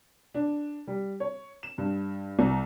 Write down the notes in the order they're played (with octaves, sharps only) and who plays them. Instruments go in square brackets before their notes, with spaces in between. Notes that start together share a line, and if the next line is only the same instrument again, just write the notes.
[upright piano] D4
G3
C#5
E7
G2
C2